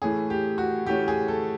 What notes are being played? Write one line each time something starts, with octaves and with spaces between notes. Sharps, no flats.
A2 E3 A3 C#4 G#4
G4
F#4
A2 E3 A3 C#4 G4
G#4
A4